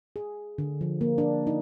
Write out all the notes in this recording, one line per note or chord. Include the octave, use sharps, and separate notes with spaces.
G#4
D3
F3
A#3
D4
D#4